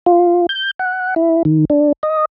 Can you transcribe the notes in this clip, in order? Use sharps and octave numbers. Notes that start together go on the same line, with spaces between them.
F4
G6
F#5
E4
D#3
D4
D#5